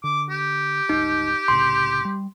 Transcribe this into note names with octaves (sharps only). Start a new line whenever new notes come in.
D3 D6
G4
G1 C#2 D#4
C2 A2 C#3 C6
G3